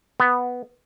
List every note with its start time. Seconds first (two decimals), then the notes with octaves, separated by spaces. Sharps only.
0.20 B3